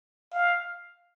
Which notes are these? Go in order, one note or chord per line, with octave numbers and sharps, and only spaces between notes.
F5